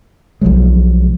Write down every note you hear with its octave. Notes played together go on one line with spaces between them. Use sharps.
B1 F3 F#3 G#3